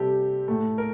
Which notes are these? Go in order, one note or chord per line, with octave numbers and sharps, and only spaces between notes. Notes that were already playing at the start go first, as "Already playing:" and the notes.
Already playing: C3 G3 G4 A4
A2 A3
A#4